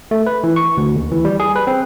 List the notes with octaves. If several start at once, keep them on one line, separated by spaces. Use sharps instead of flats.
A3
B4
E3
C#6
D2
D#2
E3
G3
G#4
B4
C4